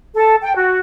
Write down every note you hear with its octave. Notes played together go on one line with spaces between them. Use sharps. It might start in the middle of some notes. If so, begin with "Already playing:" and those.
A4
G5
F#4